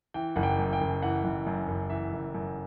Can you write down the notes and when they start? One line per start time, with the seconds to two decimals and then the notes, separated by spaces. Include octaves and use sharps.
0.14 E3 G5
0.36 F#1 F#5
0.43 G5
0.59 F#2
0.73 G5
0.81 F#1
1.02 E3 F#5
1.24 F#1
1.47 F#2
1.68 F#1
1.90 E3 E5
2.13 F#1
2.35 F#2